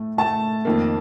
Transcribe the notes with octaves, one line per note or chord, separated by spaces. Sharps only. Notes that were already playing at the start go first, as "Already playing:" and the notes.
Already playing: A2 A3
A2 A3 A5
F2 D#3 A#3